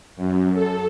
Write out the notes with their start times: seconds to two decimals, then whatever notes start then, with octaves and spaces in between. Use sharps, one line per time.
0.16 F#2
0.54 A4